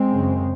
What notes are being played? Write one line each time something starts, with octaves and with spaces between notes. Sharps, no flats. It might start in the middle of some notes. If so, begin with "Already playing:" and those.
Already playing: G#3 C4
F#2 C#3